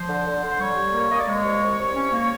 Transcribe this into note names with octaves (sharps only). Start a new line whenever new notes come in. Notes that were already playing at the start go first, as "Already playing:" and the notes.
Already playing: F3 C5
D3
D3
D3
G3 C#5
G3
A#3
A#3 D#5
D5
G#3 C#5
C2
C2
C2
C#4
A#3